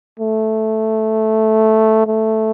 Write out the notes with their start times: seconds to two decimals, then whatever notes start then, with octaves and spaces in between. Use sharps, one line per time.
0.20 A3
2.07 A3